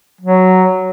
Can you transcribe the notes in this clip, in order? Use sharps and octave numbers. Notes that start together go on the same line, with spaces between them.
F#3